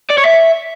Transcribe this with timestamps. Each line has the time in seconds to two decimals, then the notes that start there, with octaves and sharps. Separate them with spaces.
0.10 D5
0.17 C#5
0.25 E5